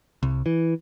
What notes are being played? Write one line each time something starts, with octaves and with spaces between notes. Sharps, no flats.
C2
E3